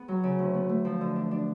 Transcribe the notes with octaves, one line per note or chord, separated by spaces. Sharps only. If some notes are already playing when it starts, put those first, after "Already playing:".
Already playing: B3 G#4
F#3
C#3
D2
B3
A3
F3
D3
D4
D4